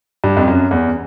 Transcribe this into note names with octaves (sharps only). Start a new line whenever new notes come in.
G2
F2
F#2
E2